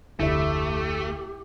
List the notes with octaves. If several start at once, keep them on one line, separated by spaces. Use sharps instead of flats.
F1 D2 D3 A3 E4 G4 E5